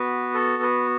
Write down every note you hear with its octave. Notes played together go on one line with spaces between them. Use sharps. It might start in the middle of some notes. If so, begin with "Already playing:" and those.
Already playing: B3 F#4 B4
A4
B4